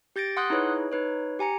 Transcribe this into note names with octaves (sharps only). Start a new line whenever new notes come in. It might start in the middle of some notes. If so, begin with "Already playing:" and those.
G4 G6 A6 A#6 D7
F#5 C6 D#6 F#6 G6
D#4 E4 G#4 B4 C#5
D#4 B4 C#5
G4 G#5 A#5 C#7